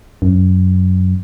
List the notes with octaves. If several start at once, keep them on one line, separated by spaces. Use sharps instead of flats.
F#2